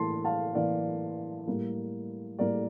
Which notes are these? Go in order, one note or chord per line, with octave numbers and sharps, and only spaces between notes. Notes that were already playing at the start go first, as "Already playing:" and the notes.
Already playing: A2 E3 A#3 A5 C6
F5 A5
A2 E3 A#3 D5 F5
A2 G3 A#3
A2 G3 A#3 A#4 D5